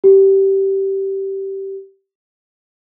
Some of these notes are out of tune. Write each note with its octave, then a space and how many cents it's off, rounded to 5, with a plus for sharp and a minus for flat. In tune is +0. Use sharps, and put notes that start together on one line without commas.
G4 -15